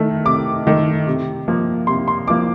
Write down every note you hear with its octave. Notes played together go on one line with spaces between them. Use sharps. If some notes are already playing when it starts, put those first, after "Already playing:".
Already playing: D#3 A3
C3 D6
D#3 A3
C3
F3 A#3
C3 C6
C6
F3 A#3 D6